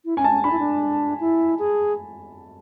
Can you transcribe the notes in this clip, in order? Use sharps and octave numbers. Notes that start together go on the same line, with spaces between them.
E4
C#4 G#5
A5
C#4
D4 B5
E4
D4
E4
G#4